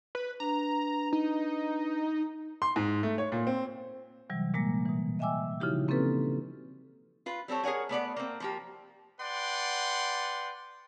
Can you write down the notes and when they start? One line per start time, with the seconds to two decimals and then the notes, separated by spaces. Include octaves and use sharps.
0.15 B4
0.40 D4 B4 A#5
1.13 D#4
2.62 C6
2.76 G#2
3.03 A3
3.18 C#5
3.32 A#2
3.47 C4
4.30 C3 E3 F#3 G3
4.54 A#2 G#3 A#3 A#6
4.86 B2 E3
5.19 D#5 E5 G5 G#5 D6 E6
5.60 C#3 F3 D#4 E4 F#4 G4
5.88 A#3 C4 C#4 G4 A4 B4
7.26 F4 B4
7.48 G3 C4 A4 C#5
7.63 G#4 A#4 C#5 F#5 G#5
7.89 A3 B3 D5 F#5
8.16 A#3 C4
8.40 F3 A#3 G4
9.20 B4 D5 F#5 G5 C6